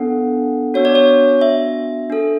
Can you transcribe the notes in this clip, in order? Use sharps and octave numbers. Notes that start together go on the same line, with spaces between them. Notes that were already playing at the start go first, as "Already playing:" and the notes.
Already playing: B3 D4 A4 F#5
B3 D4 F#4 C#5
D5
C#5
E5
D4 A4